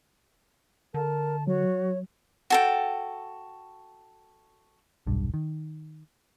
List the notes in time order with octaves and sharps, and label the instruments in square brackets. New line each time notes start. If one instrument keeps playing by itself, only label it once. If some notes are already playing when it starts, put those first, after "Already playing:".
[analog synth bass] D3 [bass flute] A#4 [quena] A5
[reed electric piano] F#3 [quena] F#4 [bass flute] C#5
[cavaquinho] F#4 A4 G5
[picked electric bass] D#1 B1 G2
D#3